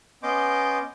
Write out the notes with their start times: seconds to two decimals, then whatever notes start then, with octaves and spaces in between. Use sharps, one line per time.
0.23 B3 C#4 D#5 C6 D6 G6